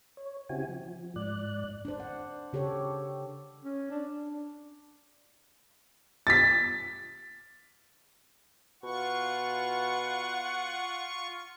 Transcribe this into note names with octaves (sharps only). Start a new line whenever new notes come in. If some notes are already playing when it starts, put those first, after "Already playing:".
C#5
C#3 C4 E4 F#4 G4 G#5
F3
G#2 D5 F#6
D4 C5
F#5
C#3 G4 A4 C#5
C#4
D4
A6 B6
B2 F4 F#5 C#6